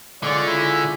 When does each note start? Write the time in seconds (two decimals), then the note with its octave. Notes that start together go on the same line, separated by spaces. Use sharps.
0.23 D3 G#3 C#4 F4 D5
0.47 C#3 E4